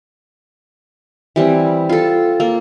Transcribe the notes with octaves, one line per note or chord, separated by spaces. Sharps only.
E3 G3 C4
F4 A4
A#3